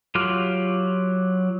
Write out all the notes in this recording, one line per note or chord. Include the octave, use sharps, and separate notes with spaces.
F#3 F4 G4 F6